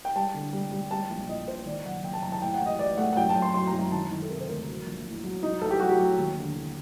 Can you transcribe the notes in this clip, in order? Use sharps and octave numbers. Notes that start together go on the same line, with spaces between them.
G5
G3 A5
D3
G3
G3
G3 A5
A#1
A#2 D#5
A#2 C5
D#3 D5
F#1 F#5
F#1 G5
A5
F#1 A#5
A5
A2 G5
F#5
A1
D#5
A1 D5
A3 F#5
F#5
F#2 G5
A5
F#2
C6
F#3 C6
A#5
F#2
A#5
D#3 A5
D#3
A4
C3 A#4
C5
D2 A#4
F#3
A#1
A2
F#3
F#3 D#4
A1 A4
G4
F#3 F#4
G4
F#3
D#2
D3
D#2